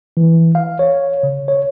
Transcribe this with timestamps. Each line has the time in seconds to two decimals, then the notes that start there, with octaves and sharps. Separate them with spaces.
0.17 E3
0.55 F5
0.79 C#5
1.23 C#3
1.48 C#5